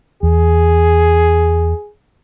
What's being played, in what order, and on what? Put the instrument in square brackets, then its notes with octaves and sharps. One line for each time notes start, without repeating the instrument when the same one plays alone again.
[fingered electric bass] E2 [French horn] G#4